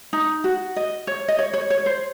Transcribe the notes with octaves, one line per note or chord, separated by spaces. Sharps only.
D#4
F#4
D#5
C#5
D#5
C#5
C#5
C#5
C5